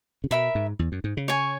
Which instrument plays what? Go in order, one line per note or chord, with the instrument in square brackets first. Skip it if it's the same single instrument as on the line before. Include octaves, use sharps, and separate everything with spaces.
[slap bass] C#3
[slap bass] B2 [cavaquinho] A#4 E5 B5
[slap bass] G#2
E2
F#2
G#2
C#3
[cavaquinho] C#5 G#5 C#6